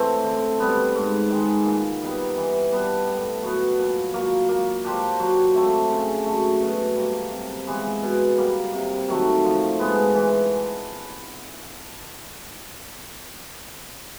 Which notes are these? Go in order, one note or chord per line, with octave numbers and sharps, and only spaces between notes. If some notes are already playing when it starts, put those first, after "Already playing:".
Already playing: E3 A3 C4
D3
G3 B3
G#2
D#3 G#3
A#2
G3 B3 D#4
E3
G3 B3 D4
A2
F#3 B3
A#2
F#3 A#3
A#3
D4 G4 C5
F#3
A3 C4
C#3
F#3 A3
B2
G3 A#3
C3
E3 G#3 B3
B2
G3 A#3
C3
D#3 F#3 A3
F3
G#3 B3
E3